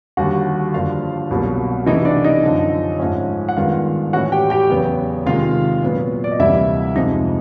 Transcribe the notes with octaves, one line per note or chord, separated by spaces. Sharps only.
D#2 D3 G3 F#4 F#5
G2 D3 F3 A#3 F4 F5
C2 B2 F#3 A#3
C3 E3 A3 D#4 D#5
D4 D5
D#4 D#5
F#2 D3 F3
G#2 F3 A3 C#4
F#5
G2 D#3 G#3 B3 F4 F5
A2 E3 A3 C#4 F#4 F#5
G4 G5
G4 G5
E2 C#3 F#3 B3
C3 D#3 G#3 F4 F5
A#2 F#3 B3
D5
D#5
D2 C3 E3 G3 A#3 E4 E5
F2 C3 F3 G#3 C4 D#4 D#5